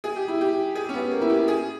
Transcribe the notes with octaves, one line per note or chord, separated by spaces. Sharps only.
G#4
G4
E4
G4
G#4
C#4
B3
A#3
E4
G4
G#4